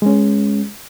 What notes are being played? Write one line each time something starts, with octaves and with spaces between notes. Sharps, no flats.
G#3 C#4